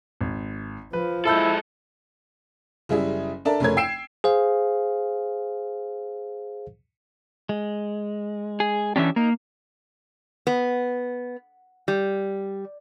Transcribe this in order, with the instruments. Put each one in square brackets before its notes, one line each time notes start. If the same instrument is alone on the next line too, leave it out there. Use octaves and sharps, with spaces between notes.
[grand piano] G#1
[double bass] F3 [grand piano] B4
[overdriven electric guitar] G#3 A4 [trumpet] E4 [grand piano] A5 E6 G6
[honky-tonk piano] F#1 G3 E4 G#4 E5
D4 A4 A#4 D5 E5 A5
F1 C#3 A3 A#4 C#5 G#6
G5 E6 C7 D7 E7
[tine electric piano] G#4 C5 F5
[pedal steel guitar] G#3
[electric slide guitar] G#4
[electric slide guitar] E3 C#4 D4 [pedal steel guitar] G4 E5
[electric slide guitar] A#3 [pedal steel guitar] D#4 A#4
[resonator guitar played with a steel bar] B3
G3